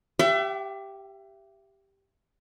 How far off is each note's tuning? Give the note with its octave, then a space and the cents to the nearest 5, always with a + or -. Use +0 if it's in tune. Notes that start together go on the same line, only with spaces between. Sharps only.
G4 +0 E5 +30 G5 -45